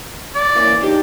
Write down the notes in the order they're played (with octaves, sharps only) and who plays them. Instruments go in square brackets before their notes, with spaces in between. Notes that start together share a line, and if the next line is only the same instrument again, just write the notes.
[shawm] D5
[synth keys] E3 A#3 C#4
D4 D#4 G4